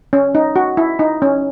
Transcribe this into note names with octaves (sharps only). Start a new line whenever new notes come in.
C#4
D#4
F#4
E4
D#4
C#4